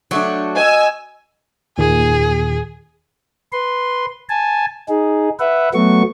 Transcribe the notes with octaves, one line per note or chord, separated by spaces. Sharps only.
F#3 A3 D4 F#4
D#5 G#5 E6
D#2 A#2 D#3 G#4
B4 C6
G#5 A5
D#4 G#4
B4 E5 F#5
F#3 A3 B3 F#4 C#6